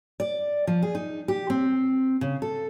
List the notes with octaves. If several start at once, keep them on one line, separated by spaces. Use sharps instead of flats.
D5
F3
G#4
D#4
G4
C4
C#3
A4